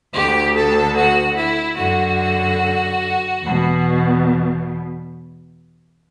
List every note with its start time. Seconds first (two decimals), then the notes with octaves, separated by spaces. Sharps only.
0.13 D2 D3 G4
0.55 A4
0.96 F#4
1.36 E4
1.77 F#2 D3 F#4
3.41 E2 B2